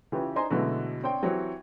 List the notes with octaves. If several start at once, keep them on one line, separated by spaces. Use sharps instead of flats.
C#3 E3 F4 G4 B4
D4 D#4 C5 G#5 A#5 C6
B2 D3 E3 F#3 G#3 A3
C4 D4 C5 C#5 G5
E3 F#3 C4 G4 C#5